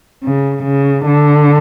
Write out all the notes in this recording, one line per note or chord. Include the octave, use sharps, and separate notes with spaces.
C#3
C#3
D3